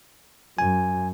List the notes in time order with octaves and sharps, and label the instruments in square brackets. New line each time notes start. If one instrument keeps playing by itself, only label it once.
[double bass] F#2 [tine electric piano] G#5